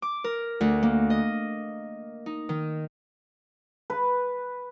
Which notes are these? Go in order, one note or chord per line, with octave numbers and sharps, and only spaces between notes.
D6
A#4
D2
A#3
D#5
D#4
D#3
B4